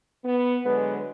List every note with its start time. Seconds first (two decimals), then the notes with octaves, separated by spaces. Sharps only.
0.25 B3
0.65 D3 F#3 G#3 B3